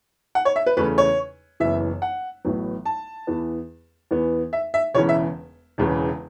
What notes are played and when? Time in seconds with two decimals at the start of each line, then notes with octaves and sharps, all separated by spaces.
0.35 F#5
0.45 C#5
0.56 E5
0.67 B4
0.77 E2 C#3 A3 C#4 B4
0.98 C#5
1.60 F#1 F#2 E3 B3 E5
2.02 F#5
2.45 A1 A2 F#3 B3
2.86 A5
3.27 E2 E3 B3
4.11 E2 E3 B3
4.53 E5
4.74 E5
4.94 E1 E2 C#3 E3 C#4 C#5
5.09 E5
5.78 E1 E2 C#3 E3